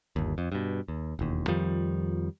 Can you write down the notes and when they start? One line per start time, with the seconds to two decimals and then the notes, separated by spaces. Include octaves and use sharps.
0.16 G1 D#2
0.38 F2
0.52 G2 B2
0.88 D#2
1.19 E1 D#2
1.47 F2 D#3 F3 G3